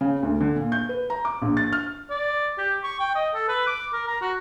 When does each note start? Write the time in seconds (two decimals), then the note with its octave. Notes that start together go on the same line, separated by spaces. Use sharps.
0.01 C#3
0.23 D2
0.40 D3
0.56 A#2
0.72 G6
0.89 B4
1.10 A#5
1.25 D6
1.42 A#1
1.57 A6
1.73 F6
2.10 D5
2.58 G4
2.83 C#6
3.00 G5
3.15 D#5
3.35 A4
3.48 B4
3.67 D6
3.93 A#4
4.08 A#5
4.21 F#4